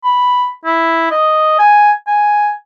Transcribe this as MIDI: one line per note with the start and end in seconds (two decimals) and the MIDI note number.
0.04 0.49 83
0.66 1.08 64
1.11 1.57 75
1.59 1.91 80
2.07 2.51 80